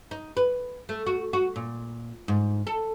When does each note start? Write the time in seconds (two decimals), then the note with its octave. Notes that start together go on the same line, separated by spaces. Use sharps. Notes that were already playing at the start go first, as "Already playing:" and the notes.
0.11 D#4
0.37 B4
0.89 A3
1.06 F#4
1.33 F#4
1.56 A#2
2.28 G#2
2.67 A4